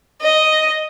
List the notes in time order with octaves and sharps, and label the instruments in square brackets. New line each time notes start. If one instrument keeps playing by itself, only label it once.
[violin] D#5